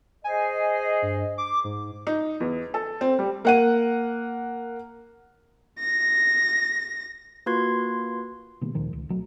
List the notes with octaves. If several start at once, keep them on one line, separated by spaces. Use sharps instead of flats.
G#4 C5 D#5 G#5
G2
D6
G#2
D#4
E2
A4
C4
G3
A#3 F#5 D#7
A#6
A#3 F4 F#4 B4 C6 G#6
B2 D#3 G3 A#3
D2 A#2 D#3 F3
C#2
B1 F#3 A3